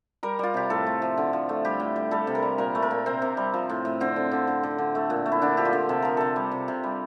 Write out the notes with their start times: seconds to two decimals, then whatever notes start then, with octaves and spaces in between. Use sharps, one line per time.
0.23 G3 A#4
0.39 G3 F4
0.54 C3 G4
0.70 A2 A4
0.87 A3
1.02 F3
1.17 D3
1.33 F3
1.49 A3
1.65 G3 G4
1.80 A2
1.96 G3
2.11 G3 A4
2.27 C3
2.35 A#4
2.43 G3
2.58 A#2 A#4
2.75 A3
2.82 A#4
2.91 A#2
3.06 C3 C4
3.22 C3
3.37 G3
3.54 F3
3.69 A2
3.85 A2
4.00 D3 C4
4.16 D3
4.31 D3
4.47 D3
4.63 D3
4.78 D3
4.95 A3
5.10 A#2
5.26 A3
5.32 E4
5.42 D3 D4
5.57 F3 G4
5.65 F4
5.73 D3
5.89 C3 A4
6.02 F3 A#4
6.17 C3 A4
6.36 G3
6.52 C3
6.68 C3
6.83 G3